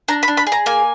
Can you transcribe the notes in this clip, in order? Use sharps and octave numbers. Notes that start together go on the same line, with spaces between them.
D4 A#5
B5
D4
B5
G#4
A#5
A#3 G#5